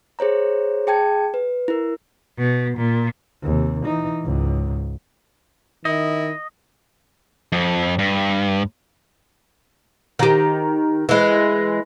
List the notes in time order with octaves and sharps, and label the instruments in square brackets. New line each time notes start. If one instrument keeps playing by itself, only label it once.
[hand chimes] G#4 C5 C#5 A#5
G#4 G5 A5 G#6
B4
E4 A#4
[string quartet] B2
A#2
[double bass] D#2 C3
E3 D#4
C#2 G#2
[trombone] D#3 [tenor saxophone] E4 [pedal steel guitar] D#5
[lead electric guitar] F2
G2
[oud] D#3 G4
E3 G#3